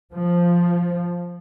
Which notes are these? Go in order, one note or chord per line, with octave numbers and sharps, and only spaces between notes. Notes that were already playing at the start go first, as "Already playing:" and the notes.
F3